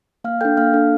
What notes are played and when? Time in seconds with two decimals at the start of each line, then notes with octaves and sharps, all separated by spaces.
0.24 A#3 F5 F6
0.41 D4 A4 G5 G6
0.57 A#3 F5 F6
0.73 D4 A4